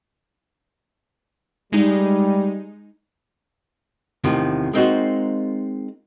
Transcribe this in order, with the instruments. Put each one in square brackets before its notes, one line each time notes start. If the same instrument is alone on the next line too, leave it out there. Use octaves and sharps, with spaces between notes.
[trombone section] G3 [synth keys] G#3 D#4
[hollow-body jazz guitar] E2 A2 C3 D#3 F3
G#3 A#3 C4 D#4 F4 F#4